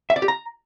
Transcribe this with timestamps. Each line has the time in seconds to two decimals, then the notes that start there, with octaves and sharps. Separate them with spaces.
0.10 E5
0.16 D5
0.22 G4
0.28 A#5